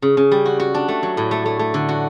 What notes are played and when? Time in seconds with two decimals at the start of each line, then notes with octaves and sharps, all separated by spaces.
0.02 C#3
0.17 C#3
0.31 G3
0.46 F#4
0.60 F#4
0.74 D4
0.88 A3
1.03 F#3
1.17 A2
1.31 A3
1.46 A3
1.59 A3
1.74 D3
1.89 F#4